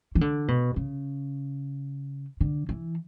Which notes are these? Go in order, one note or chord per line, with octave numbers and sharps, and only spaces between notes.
E3
D3
B2
C#3
D3
E3